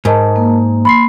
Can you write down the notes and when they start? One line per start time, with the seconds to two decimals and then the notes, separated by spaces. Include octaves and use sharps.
0.05 G#2 A#4 D#5 A5
0.36 A#3
0.85 B5 C6 C7